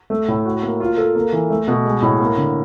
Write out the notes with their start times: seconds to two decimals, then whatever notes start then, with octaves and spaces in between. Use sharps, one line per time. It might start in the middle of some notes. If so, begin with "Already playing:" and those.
0.10 A3
0.28 A2
0.45 F#4
0.63 A#3
0.80 F4
0.97 A4
1.15 A#3
1.32 E3
1.50 A3
1.68 B2
1.85 G#3
2.02 A2
2.20 A#3
2.37 D3